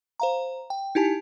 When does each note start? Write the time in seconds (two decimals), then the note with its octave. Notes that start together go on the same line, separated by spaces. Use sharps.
0.20 C5 F5 A#5
0.70 G5
0.95 D#4 E4 G4 G#5 A5